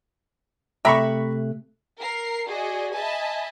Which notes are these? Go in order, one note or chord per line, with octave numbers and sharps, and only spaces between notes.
C3 A3 G4 E5 A#5 B5 C#6 F#6
A#4 C7
F#4 G#4 D5 D#5
D#5 E5 G#5 A5 B5